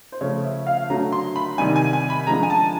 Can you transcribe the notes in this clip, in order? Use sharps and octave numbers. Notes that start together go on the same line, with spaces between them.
C5
C#3 F3 A3 C#5
E5
F5
D3 F#3 A3 A#5
C6
B5
C3 D#3 G3 G#5
G#5
G#5
B5
D3 F3 G#3 A#5
G#5
A5